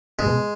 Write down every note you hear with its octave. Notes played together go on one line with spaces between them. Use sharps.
G#2 G#3
B2